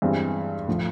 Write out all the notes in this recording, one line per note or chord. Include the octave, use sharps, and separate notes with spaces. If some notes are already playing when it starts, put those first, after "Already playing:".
G2 E3 G#3 C4
A2 F3